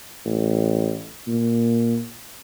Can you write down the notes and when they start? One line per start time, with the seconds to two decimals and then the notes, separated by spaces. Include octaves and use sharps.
0.25 A1
1.27 A#2